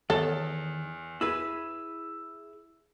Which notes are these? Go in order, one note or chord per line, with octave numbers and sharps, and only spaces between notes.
E2 D#3 A4 C#5
E4 G#4 B4 E6